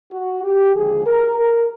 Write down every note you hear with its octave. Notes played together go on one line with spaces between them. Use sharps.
F#4
G4
D#2 D3 F3 G#3 G#4
A#4
A#4